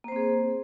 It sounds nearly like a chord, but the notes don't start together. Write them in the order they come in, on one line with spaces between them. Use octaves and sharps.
A#3 C5 C4 G#4